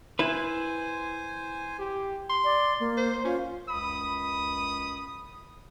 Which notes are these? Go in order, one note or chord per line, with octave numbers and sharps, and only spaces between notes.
E4 B4 C5 G#5
G4
C6
D5
A#3
C5
C#4 F4
C#2 F#2 B5 D#6